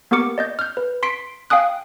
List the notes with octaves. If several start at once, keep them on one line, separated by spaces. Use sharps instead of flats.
A#3 B3 G4 A#4 D6 C#7
D5 D#5 G6
F6 G6
B4
C6 B6 C7 D7
F5 G5 G#5 D#6 F#6